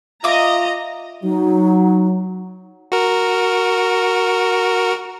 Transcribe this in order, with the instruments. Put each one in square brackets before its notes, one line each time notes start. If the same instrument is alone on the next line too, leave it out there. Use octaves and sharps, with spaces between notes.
[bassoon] F4 [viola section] D#5 A#5 [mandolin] E5 D6
[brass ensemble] F#3 [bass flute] D#4
[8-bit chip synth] F#4 A#4